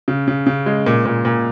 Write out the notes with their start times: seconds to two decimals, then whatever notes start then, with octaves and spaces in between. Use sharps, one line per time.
0.08 C#3
0.28 C#3
0.47 C#3
0.66 G#3
0.86 A#2
1.06 A#2
1.25 A#2